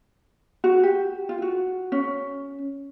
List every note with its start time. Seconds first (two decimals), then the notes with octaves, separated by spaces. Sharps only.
0.64 F#4
0.83 G4
1.29 F4
1.42 F#4
1.92 C#4